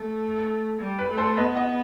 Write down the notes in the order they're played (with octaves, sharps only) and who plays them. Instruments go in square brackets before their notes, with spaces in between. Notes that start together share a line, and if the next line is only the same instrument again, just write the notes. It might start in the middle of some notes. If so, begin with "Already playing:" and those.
Already playing: [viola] A3
G3
[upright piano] B4
[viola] A3
[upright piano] A4 C5
[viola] B3 [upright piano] B4 D#5
[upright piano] D#5 F#5